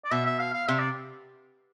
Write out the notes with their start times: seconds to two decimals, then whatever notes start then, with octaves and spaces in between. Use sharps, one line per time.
0.04 D5
0.11 B2 E5
0.26 E5
0.39 F5
0.53 F5
0.68 C3 E5
0.79 D5